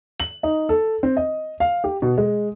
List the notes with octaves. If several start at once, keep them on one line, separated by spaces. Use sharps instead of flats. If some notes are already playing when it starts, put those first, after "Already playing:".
F#7
D#4
A4
C4
D#5
F5
G4
B2
G#3